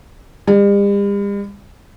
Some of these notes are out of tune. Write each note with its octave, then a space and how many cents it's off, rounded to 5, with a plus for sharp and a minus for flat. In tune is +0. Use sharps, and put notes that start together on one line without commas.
G3 +45